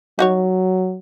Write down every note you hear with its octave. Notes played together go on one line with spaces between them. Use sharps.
F#3 D#4 F#4 C#5